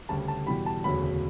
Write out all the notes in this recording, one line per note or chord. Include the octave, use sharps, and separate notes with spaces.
D2 C#3 G3 A5
A5
E2 B2 G3 B5
A5
E1 D2 C#3 F#3 B5